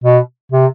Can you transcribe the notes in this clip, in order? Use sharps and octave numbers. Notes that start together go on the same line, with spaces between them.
B2
C3